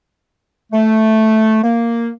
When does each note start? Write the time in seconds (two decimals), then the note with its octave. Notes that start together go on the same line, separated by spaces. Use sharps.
0.72 A3
1.63 A#3